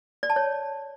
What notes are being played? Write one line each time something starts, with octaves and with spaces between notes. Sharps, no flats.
D5
A5
C#5